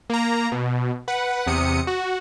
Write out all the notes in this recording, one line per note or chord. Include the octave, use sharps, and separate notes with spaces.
A#3 A#5
B2
B4 F#5
E2 C3 D#6 C#7
F#4